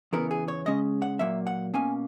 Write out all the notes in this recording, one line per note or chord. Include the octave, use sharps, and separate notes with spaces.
E2 C#3 E3 B3 A#4
G#4
C#5
C#3 G#3 C#4 D#5
F#5
A#2 F#3 A#3 E5
F#5
B2 A#3 C#4 G#5